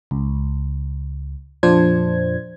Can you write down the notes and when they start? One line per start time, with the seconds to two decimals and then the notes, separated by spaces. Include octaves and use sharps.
0.11 C#2
1.63 F2 A#2 F3 D4 C5 G#6